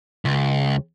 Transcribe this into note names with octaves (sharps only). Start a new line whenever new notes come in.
C#2